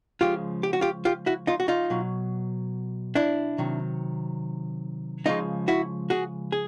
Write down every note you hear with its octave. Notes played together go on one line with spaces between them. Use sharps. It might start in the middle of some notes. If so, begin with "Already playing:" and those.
C#3 F3 G#3 F4 G4
G4
F#4
F4 G4
F4 G4
E4 F#4
D#4 F4
F#4
D#4 F4
B2 F#3
D4 E4
C3 D#3 F#3
C#3 F3 G#3 D#4 F4
E4 F#4
F#4 G#4
G#4